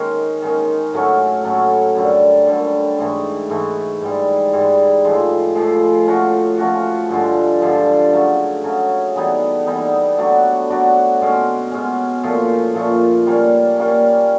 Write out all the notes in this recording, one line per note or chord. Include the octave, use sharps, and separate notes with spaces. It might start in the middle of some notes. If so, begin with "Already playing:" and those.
Already playing: D#3 G#3 C#4
D#3 G#3 C#4
A2 F#3 A3 C#4
A2 F#3 A3 C#4
F#2 D3 G3
F#2 D3 G3
G#2 E3 A3
G#2 E3 A3
G#2 E3 G3
G#2 E3 G3
A2 F3 G#3
A2 F3 G#3
F3 A3 C#4 F#4
F3 A3 C#4 F#4
G2 D3 F3 G#3
G2 D3 F3 G#3
C#3 F#3 A3
C#3 F#3 A3
E3 G3 B3 D#4
E3 G3 B3 D#4
F#3 A3 D4 F#4
F#3 A3 D4 F#4
B2 G#3 C#4
B2 G#3 C#4
A#2 F3 A3
A#2 F3 A3
G3 A#3 C#4
G3 A#3 C#4